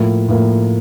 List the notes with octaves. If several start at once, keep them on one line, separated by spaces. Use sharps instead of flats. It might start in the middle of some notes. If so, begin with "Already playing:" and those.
Already playing: A2 F3 A#3
A2 F3 A#3